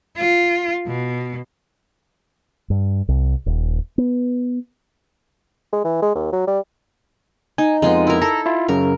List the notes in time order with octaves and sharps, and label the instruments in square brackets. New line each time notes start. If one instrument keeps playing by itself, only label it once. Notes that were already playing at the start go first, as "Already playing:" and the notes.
[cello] F4
B2
[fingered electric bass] G2
C2
D#1
B3
[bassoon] G#3
E3
G#3
D#2
F#3
G3
[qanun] D#4 [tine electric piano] G#5
[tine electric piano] F2 B3 [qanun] G#3 F4 D#5
[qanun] E4 A#4
[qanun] A4 [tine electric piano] A#5
[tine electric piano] E4 F4
[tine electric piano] F#2 C#3 [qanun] A#4